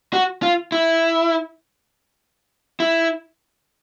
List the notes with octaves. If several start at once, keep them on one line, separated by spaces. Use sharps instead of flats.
F#4
F4
E4
E4